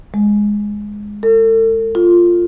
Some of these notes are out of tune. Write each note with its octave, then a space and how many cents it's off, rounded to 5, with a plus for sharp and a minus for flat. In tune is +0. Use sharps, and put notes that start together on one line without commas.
G#3 -5
A4 +40
F4 +0